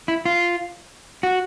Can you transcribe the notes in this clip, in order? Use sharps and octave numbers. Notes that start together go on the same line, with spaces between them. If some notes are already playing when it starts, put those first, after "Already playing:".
E4
F4
F#4